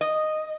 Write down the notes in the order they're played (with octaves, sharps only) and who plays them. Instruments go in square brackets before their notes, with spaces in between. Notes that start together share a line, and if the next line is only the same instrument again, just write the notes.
[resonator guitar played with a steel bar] D#5